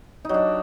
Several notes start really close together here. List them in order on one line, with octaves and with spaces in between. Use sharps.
D#4 F#3 D4